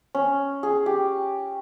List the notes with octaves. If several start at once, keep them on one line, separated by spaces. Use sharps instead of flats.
C#4
G#4
G4